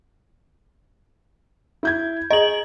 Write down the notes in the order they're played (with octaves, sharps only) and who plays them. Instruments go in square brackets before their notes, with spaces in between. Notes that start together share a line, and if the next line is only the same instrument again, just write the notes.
[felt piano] E4 G6 G#6
[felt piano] G#4 A#5 [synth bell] D#5 F#7